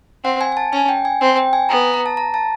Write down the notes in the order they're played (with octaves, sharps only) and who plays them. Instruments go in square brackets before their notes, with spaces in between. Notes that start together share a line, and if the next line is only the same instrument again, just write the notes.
[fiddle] C4 [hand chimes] F#5
[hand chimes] G#5
G#5
A5
[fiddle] C#4 [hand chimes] G#5
[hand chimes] G5
G#5
[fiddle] C4 [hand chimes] G5
[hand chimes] G5
G#5
[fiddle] B3 [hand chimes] A#5
[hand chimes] A#5
A#5
A5
A#5
A5